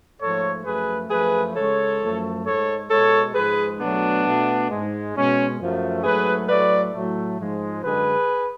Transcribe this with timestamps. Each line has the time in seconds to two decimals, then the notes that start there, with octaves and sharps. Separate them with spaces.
0.20 G#2 F3 A3 A4 C#5
0.65 F#2 F3 A3 G#4 B4
1.10 F#2 F3 A3 G#4 B4
1.55 C#3 G#3 A4 C#5
2.01 F#2 F3 A3
2.45 G#2 G#3 A4 C#5
2.90 B2 G#3 A4 C#5
3.34 G#2 F3 G#3 G#4 B4
3.79 B2 F#3 A3 B3 D4
4.25 B2 A3
4.70 G#2 G#3
5.14 B2 G#3 C#4
5.59 F#2 F3 A3
6.04 G#2 F#3 A3 G#4 B4
6.49 A2 F#3 A3 B4 D5
6.94 A2 F#3 A3
7.39 G#2 F3 G#3
7.83 F#2 D3 G#3 G#4 B4